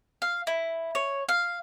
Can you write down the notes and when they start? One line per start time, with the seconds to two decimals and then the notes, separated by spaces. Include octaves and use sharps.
0.22 F5
0.47 E4
0.95 C#5
1.29 F5